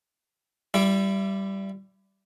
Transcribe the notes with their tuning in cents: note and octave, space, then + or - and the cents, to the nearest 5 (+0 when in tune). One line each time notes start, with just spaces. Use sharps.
G3 -5 E4 +30